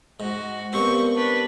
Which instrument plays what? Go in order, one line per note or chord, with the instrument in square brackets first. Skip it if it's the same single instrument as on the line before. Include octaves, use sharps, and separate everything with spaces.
[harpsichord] G#2 [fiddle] F#4
[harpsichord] G2 C4 [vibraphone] B3 G4 A#4 [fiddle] C#6
[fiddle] D4 B4